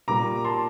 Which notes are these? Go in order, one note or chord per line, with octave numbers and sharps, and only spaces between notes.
A#2 G3 A#3 A#5 D6
A5 C6